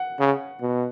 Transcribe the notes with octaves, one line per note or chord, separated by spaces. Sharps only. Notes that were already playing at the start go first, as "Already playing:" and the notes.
Already playing: F#5
C#3
B2